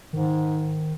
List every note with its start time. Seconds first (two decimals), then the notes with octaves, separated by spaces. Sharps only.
0.13 G#2 D#3